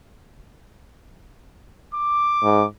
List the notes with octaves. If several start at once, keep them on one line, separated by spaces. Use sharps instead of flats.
D6
G#2